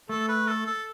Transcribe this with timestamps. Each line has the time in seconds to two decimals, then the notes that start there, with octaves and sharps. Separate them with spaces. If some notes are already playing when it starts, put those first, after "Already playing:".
0.09 A3 A4
0.29 B4
0.48 A4
0.67 A4